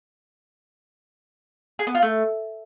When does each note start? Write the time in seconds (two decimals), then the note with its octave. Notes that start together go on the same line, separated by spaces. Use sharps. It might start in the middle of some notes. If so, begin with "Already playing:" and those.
1.79 G#4
1.87 B3
1.95 F4
2.02 A3